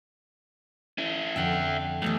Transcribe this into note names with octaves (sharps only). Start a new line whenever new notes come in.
C#4 E4
F2 D3 E5 F#5 G5
B1 E3 G3 A3